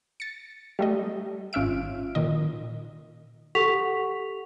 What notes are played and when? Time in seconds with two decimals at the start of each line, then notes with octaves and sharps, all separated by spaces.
0.20 A6 C#7
0.79 G3 A3 D#5
1.53 G#1 C#4 F4 E5 D7
2.15 A#2 D#3 D#5
3.55 G4 A4 F#5 C#6 B6 F7